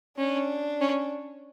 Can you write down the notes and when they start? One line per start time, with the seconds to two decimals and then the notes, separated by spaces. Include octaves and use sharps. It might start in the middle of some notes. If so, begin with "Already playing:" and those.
0.18 C#4 D4
0.81 C#4